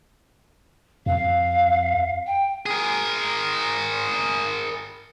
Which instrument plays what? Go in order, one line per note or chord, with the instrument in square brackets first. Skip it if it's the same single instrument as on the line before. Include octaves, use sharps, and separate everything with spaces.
[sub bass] F2 [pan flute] F5
[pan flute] G5
[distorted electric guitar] G#4 A#4